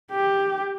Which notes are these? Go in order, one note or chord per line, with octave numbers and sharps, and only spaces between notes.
G4